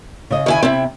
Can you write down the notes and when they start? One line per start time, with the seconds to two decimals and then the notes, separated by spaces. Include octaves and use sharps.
0.30 C#3 D#5
0.46 D#3 E4 G#5
0.63 C3 C4 E4